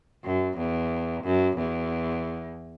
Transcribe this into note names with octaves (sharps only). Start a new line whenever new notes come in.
F#2
E2
F#2
E2